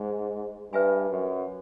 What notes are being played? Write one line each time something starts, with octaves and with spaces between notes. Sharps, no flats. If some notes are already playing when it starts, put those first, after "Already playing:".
Already playing: G#2
G2 B4 E5 G#5 B5
F#2